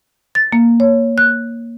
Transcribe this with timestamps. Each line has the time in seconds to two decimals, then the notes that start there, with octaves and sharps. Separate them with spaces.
0.35 A6
0.53 A#3
0.80 C#5
1.18 F#6